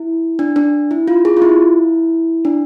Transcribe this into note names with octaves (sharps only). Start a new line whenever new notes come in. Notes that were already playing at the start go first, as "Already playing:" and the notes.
Already playing: E4
D4
D4
E4
F4
G#4
F4
E4
D4